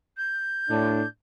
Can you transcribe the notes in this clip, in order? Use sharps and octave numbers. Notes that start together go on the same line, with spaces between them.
G6
A2 D4